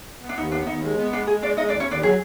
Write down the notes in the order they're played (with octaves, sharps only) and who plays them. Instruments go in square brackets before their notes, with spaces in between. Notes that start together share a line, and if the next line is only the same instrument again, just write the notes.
[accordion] B3
[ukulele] D4
[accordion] D#2 [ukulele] D#4
[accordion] B3 [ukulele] D4
[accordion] D#2 [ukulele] D#4
[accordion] G#3
B3
[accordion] G#3 [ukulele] D4
[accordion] G#3 [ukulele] G#4
[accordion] G#3 [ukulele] D4 D5
[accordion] G#3 [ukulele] D#4 D#5
[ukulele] D4 D5
[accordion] D#2
[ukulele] C#4 C#5
[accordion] D#2 [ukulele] D4 D5
[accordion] F#3 [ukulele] G#4